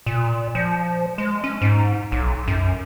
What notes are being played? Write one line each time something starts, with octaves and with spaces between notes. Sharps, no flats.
A#2
F3
G#3
C#4
G#2
B1
F#2